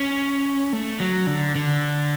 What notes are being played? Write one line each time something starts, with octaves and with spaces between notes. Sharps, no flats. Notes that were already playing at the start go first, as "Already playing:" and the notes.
Already playing: C#4
A3
F#3
D3
D3